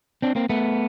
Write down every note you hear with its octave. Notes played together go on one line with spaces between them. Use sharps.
C4 D4
A#3 C4
A3 B3